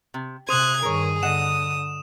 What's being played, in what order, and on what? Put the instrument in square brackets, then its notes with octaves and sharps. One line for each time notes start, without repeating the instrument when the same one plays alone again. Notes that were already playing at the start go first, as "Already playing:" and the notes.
[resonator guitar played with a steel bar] C3
[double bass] C3 [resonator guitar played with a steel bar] C5 [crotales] D#6 D#7 [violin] F#6 G#6
[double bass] G2 D#3 [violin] G#4 [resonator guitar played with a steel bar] A#4 C#5
[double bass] D3 [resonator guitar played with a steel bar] D#5 F#5 [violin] D#6 [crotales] E7